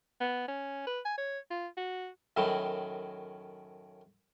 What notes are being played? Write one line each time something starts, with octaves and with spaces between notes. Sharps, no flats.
B3
C#4
B4
G#5
C#5
F4
F#4
F#2 A2 D#3 F#3